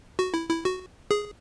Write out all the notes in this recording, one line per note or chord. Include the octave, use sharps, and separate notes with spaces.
F#4
E4
E4
F#4
G#4